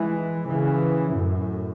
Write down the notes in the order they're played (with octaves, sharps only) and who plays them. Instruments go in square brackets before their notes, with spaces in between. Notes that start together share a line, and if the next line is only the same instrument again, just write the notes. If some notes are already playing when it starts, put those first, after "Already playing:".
Already playing: [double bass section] E3 G#3
C#3 E3
F#2 A2